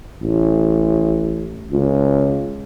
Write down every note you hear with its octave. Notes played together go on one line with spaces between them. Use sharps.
A1
C#2